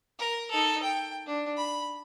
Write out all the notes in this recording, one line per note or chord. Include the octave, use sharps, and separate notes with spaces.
A#4
D#4 A4
G5
D4
B5